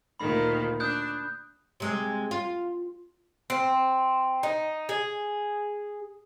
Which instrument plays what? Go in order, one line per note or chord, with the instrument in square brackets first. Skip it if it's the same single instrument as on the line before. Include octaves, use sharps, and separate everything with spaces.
[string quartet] D2 A#2 D#3 [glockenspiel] B5
[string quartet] D4 [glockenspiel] D#6 F#6 G6
[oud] C3 G#3
F4
[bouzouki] C4
D#4
G#4